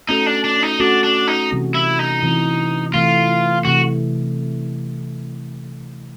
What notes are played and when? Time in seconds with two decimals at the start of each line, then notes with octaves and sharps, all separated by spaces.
0.09 A3 C#4 D#4 F#4 A4
0.26 D4
0.44 D4
0.63 D#4
0.80 A3 C#4 D4 F#4 A4
1.04 D4
1.27 D#4
1.51 C3 E3 G3 C4
1.75 E4
1.99 D#4
2.22 C3 E3 G3 C4
2.93 C3 E3 A3 F4
3.64 C3 E3 A3 F#4